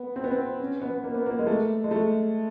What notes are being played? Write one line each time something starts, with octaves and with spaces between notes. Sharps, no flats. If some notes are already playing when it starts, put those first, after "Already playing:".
Already playing: B3
C4
B3
C4
C#4
B3
A#3
B3
A#3
G#3
A3
G#3
A3